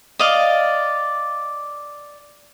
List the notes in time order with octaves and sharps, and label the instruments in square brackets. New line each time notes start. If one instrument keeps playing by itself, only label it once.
[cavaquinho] D5 D#5 F5